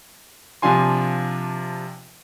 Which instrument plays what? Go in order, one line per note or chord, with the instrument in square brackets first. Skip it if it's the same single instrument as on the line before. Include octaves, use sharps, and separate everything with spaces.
[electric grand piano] C3 F3 D4 F4 G#5 C6